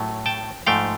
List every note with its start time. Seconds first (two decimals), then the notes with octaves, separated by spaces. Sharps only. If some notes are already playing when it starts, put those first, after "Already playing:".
Already playing: A2 F#3 A3
0.26 G5 A5
0.67 G#2 F3 A3 F5 G5